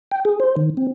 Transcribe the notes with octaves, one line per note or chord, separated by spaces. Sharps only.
G5
G#4
C5
D#3
C4